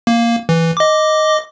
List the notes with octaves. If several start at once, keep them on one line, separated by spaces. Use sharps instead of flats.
A#3
E3
D#5 D6